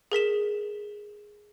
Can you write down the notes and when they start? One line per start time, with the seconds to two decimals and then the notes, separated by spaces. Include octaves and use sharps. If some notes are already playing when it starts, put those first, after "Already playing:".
0.12 G#4 A#4 B6 E7